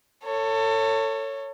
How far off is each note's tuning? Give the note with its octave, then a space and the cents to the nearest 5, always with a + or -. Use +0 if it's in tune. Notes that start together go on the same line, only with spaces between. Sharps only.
A4 +30 C#5 +0